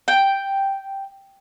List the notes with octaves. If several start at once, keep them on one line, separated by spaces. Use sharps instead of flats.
G5